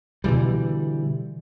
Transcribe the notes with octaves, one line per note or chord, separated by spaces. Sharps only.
B2 D3 E3 G3